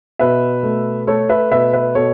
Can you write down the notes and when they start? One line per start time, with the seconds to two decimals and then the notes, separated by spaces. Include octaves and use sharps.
0.19 B2 B4 E5
0.63 A3
1.07 A3 A4 C#5
1.29 B4 E5
1.51 B2 B4 E5
1.73 B4 E5
1.95 B2 A4 C#5